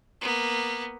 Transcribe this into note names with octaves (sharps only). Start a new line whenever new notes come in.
A#3 B3